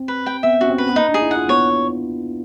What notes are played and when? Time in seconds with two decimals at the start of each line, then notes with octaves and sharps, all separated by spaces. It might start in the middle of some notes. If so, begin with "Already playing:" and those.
Already playing: C4
0.08 B4
0.26 G5
0.43 B3 E5
0.61 C#4 F#4
0.69 C4
0.78 B4
0.89 B3
0.96 A#3 D#4
1.09 D4
1.14 G#4
1.22 E4
1.31 F#5
1.36 F4
1.48 B3 C#5